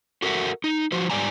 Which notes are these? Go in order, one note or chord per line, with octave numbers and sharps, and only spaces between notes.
F#4 A4 A#4 E5 F#5
D#4
F3 F#4 C5
G#2 G3 D5 G#5 A#5